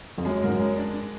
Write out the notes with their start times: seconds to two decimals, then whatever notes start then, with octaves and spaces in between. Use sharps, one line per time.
0.18 F2
0.25 F#2 G#3
0.42 G#2 A#4
0.48 F#2
0.59 G#3
0.77 D4
0.94 D4